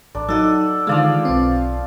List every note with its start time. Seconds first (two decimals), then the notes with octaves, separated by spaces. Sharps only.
0.15 A1 D4
0.29 F#3 D#4 A4 D5 F#5
0.87 D3 D#3 F3 G#3 D5 F5
1.25 B1 C4